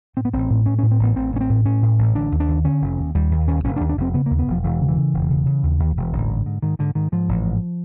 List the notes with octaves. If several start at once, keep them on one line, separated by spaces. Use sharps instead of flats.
A2 C4
B3
A1 C4
A2
A2 C#4
A2 C#4
C4
A1 B3
A1 C4
A1 C#4
C4
A2
A2 C#4
A2
A1
D3 D4
D#2
D4
D#2
D3 C#4
F1
D#2
D#2 G3
D#2
D#2 C#4
F1 C#4
D4
D#2
D4
F1 C4
C#3 B3
D#2 A#3
B3
E1 F3
E1 E3
C#3
E3
C#3
E1
C#3
C#3
D#2
D#2
E1
A1 D3
G#2
G#2
G#2 D#3
G#2 D3
G#2 D#3
G#2 F3
A1
G#2